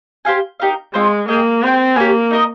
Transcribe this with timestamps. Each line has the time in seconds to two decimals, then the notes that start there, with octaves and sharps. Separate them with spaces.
0.25 G4 C5 F5 G#5
0.60 D#4 G4 A#4 F5
0.94 G#3 C4 F4 C5
1.28 A#3 G#4 D#5 G5
1.63 C4 G#4 C5 G5
1.96 A#3 G4 C#5 F5 G#5
2.31 D#4 A#4 D#5